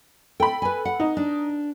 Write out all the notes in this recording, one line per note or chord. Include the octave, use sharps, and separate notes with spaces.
A4 G5 B5
B4 G#5
F#5
D#4
D4